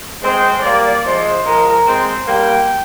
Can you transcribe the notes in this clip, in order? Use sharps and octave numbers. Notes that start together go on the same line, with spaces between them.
G#3 C4 C5
G3 A#3 D5
F3 G#3 C5
F3 G#3 A#4
G#3 C4 C5
G3 A#3 G5